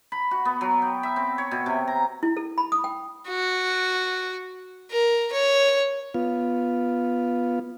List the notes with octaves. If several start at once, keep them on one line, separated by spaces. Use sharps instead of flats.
B5
F#4
B3
F#3
G5
E5
C4
C#5
B2
C3
A#5
E4
A4
B5
D#6
G5
F#4
A#4
C#5
B3 F4